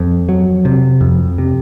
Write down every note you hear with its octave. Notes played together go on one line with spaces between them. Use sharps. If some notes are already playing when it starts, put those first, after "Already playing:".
Already playing: F2
F#3
C3
F2
C3